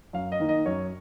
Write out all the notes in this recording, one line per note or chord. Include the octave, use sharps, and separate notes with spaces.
F#2 F5
D#5
D#3 A#3 D#4
D#5
F#2 C#5